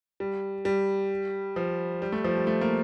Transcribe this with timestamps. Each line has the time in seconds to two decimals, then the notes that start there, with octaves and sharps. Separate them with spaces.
0.20 G3
0.65 G3
1.56 F3
2.02 G3
2.12 A3
2.24 F3
2.36 G3
2.47 A3
2.61 A#3